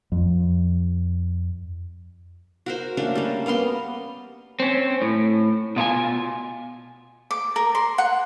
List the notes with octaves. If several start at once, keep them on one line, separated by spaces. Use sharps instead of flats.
F2
F#4 A#4 C5
A3 A#3 C#4 D4
G3 C#4
A#3 B3 A#4 C6
C4 C#4
A2
B2 F4 A4 G#5
D6
A#4
C6
F#5